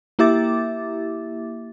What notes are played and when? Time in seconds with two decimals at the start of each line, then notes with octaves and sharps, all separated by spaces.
0.19 A#3 E4 G4 E5 D6 A6